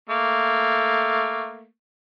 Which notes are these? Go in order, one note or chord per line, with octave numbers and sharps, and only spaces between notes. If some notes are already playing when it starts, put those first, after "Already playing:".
A3 A#3